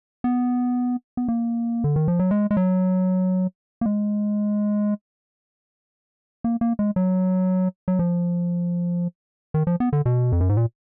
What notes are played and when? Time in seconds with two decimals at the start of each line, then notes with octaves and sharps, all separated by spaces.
0.24 B3
1.17 B3
1.28 A#3
1.84 D3
1.96 D#3
2.08 F3
2.19 F#3
2.31 G#3
2.51 G#3
2.57 F#3
3.81 A#3
3.86 G#3
6.44 A#3
6.61 A#3
6.79 G#3
6.96 F#3
7.88 F#3
7.99 F3
9.54 D#3
9.67 F3
9.80 B3
9.93 D3
10.05 B2
10.32 F2
10.40 F#2
10.49 G#2
10.57 A#2